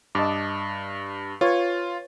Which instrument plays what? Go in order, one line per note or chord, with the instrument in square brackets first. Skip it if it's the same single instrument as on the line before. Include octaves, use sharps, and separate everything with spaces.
[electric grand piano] G2 [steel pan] D#5 A5 D6
[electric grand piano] F4 [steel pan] B4 C#5